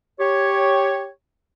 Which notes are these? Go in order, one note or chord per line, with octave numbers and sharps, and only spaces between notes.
G4 C#5